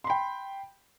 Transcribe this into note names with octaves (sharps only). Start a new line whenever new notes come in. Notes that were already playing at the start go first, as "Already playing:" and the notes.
G5 B5 C6